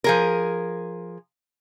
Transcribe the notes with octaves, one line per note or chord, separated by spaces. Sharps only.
F3 G#4 A#4